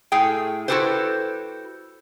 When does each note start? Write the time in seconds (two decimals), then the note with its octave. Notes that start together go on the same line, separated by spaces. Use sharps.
0.12 A2 G#4 G5
0.68 E4 F#4 G4 A4 B4 C5